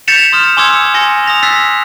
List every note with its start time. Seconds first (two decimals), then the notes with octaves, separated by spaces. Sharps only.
0.08 G6 A6 B6 C#7 E7 F7
0.32 C6 D#6 F6 A6
0.57 G#5 C6 D6 E6 G#6 C#7
0.94 G#5 C6 A#6 C#7
1.26 D#6 A#6 F7
1.43 E6 F#6 A6 B6 C7